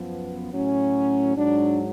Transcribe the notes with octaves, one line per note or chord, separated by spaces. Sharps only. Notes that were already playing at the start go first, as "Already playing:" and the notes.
Already playing: F#2 F3 B3
A2 F#3 C#4
G#2 F#3 D4